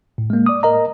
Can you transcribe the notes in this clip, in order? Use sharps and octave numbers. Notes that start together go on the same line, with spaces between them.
A2
G#3 A#3
D5 D6 D#6
A#4 D#5 A#5